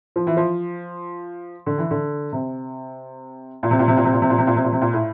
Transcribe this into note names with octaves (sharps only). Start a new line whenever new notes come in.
F3
E3
F3
D3
E3
D3
C3
A#2
C3
A#2
C3
A#2
C3
A#2
C3
A#2
C3
A#2
C3
A#2
C3
A#2
A2